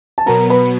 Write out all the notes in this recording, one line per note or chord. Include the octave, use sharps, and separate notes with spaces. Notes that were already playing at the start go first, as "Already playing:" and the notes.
A5
B2 F#3 B3 A#4 A#5
B4 B5